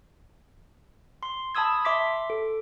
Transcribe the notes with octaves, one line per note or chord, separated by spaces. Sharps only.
C6
A5 B5 D#6 E6 G#6
E5 C6 D6 B6
A4